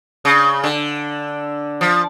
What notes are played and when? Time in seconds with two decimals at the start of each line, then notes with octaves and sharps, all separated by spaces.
0.25 C#3
0.64 D3
1.81 F3